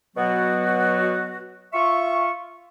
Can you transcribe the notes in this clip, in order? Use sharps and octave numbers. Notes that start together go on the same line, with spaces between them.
B2 F#3 B3 F#4
F4 E5 C#6